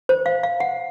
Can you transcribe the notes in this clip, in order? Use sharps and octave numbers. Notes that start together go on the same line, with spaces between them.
C5
F5
F5
F#5